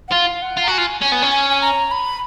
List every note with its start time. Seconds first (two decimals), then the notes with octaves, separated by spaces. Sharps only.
0.08 F#5
0.12 F4 F5
0.42 F#5
0.57 F4
0.63 A#5
0.67 F#4 G#5
0.78 F4
1.01 C#4 G#5
1.12 B3
1.22 C#4
1.31 G#5
1.50 G#5
1.61 A#5
1.91 B5